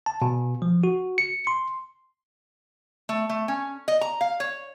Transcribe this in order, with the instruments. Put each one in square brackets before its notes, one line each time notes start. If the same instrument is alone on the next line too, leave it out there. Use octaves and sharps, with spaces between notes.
[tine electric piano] A5
B2
F3
F#4
C#7
C6
[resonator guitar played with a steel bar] A3
A3
C#4
D#5
A#5
F5
C#5